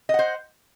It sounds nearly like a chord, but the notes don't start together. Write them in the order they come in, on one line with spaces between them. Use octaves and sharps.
D#5 F#5 C5